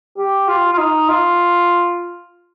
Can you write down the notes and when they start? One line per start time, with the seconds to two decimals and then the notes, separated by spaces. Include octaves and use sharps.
0.17 G4
0.48 F4
0.72 F4
0.78 D#4
1.09 F4